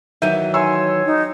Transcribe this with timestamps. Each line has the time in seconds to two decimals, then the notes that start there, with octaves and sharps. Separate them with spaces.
0.22 D#3 E3 F#3 E5 G6 D#7
0.54 C#5 G#5 C6 E6
1.05 D#4